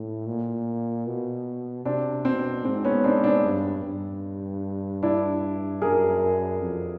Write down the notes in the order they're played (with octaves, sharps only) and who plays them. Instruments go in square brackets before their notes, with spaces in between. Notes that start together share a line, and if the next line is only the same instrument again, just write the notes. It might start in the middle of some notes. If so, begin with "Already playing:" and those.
Already playing: [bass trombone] A2
A#2
B2
[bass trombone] C3 [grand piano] C4 D4
[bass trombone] B2 [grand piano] C4
[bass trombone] G#2 [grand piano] C4
[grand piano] B3 C#4
C4 D4
C4 D4
[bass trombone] G2
G2
[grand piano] D4 E4
[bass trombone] F#2 [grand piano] G#4 A#4
[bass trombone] F2